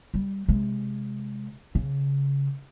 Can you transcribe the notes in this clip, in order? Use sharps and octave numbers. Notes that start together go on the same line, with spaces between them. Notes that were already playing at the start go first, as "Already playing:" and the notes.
G3
C3 G#3
C#3